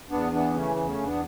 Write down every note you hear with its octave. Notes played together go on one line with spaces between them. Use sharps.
E2 B3 D4
E3 B3 D4
C#3 A3 C#4
E2
A3 C#4
E2
B3 D4